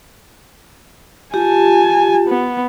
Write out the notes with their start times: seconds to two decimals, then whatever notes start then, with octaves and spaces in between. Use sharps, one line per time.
1.34 F4 G4 G#5 A5
2.28 B3